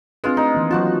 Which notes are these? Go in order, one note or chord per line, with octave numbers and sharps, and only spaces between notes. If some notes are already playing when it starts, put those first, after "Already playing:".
G#3 C4 D4 F4 B4
A3 D#4 D#5
D#3 E3 A#3
F3 F#3 F4 F#4 A5